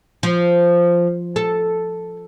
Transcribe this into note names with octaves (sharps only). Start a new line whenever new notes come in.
F3
A4